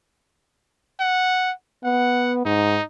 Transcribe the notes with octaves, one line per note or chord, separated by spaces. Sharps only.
F#5
B3 F#5
G#2 D#4